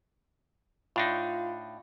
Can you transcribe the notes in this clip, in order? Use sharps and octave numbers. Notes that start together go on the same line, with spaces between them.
A2 D4 D#4 F4